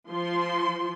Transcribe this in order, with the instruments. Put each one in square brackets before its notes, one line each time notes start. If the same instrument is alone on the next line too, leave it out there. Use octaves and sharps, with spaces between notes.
[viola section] F3 C6